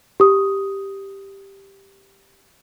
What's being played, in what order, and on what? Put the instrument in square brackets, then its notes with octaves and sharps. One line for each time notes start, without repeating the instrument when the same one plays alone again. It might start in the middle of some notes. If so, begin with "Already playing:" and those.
[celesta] G4 D#6